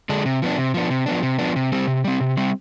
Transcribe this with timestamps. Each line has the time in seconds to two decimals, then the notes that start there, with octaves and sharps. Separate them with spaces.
0.09 D3 G#3 D4
0.26 C3
0.42 F3 B3 D4
0.58 C3
0.74 F3 B3 D4
0.90 C3
1.06 F3 B3 D4
1.23 C3
1.39 F3 B3 D4
1.56 C3
1.72 G3 C4
1.87 C3
2.04 G3 C4
2.20 C3
2.37 G3 C4